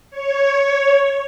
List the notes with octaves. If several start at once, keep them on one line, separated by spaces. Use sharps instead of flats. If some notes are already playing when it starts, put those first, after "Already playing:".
C#5